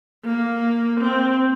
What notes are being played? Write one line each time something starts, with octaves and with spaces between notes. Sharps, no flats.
A#3
C4